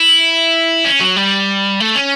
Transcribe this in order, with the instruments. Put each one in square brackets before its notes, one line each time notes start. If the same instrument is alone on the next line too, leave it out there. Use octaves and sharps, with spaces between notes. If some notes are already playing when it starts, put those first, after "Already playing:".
Already playing: [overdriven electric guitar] E4
C#4
F#3
G3
A3
C#4